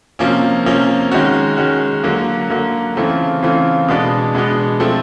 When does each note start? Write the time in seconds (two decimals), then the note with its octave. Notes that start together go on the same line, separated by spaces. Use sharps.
0.19 C3 F3 A#3 C#4
0.66 C3 F3 A#3 C#4
1.11 D#3 G#3 C#4 F#4
1.57 D#3 G#3 C#4 F#4
2.03 D3 F#3 A#3
2.50 D3 F#3 A#3
2.96 C#3 E3 A3 C4 F4
3.42 C#3 E3 A3 C4 F4
3.88 B2 G#3 B3 D4
4.34 B2 G#3 B3 D4
4.80 F3 A3 C4